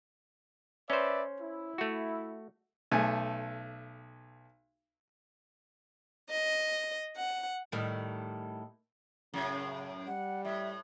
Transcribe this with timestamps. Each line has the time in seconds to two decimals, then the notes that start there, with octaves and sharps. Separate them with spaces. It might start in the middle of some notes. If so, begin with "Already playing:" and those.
0.90 C#4 B4 C5 D5 E5
1.41 E4
1.78 A3 F#4
2.91 B1 A3 G#5
6.29 D#5
7.16 F#5
7.72 A2 D#3 G3
9.34 F#2 A2 C#3
10.07 G3 F#5
10.45 A2 E5